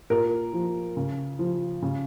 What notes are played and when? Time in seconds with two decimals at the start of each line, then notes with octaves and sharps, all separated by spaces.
0.10 A#2 A#4
0.53 F3
0.97 C#3
1.39 F3
1.82 C#3